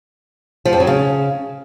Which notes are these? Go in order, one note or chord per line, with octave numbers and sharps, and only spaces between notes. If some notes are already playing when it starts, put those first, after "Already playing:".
F3
F2
F#3
C#3